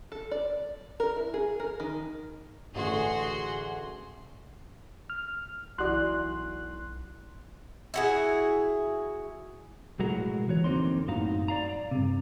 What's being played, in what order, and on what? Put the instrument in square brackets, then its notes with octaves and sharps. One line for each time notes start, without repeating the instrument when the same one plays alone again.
[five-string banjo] A4
D5
A#4
E4
G#4
A#4
D#3
[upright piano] A1 D3 [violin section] F#4 G#4 C6
[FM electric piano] F6
[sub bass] B1 [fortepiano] E3 F#4 D5 [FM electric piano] C6 F#6
[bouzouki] E4 F#4 G#4
[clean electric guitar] B1 A2 F#3 G#3 F#4 A#4
E3 F#4 C#5
E2 D3 A#3 C4 D#4 C6
F#2 A2 D#4 F#4 F5 A#5
D5 F5 A#5
G2 C3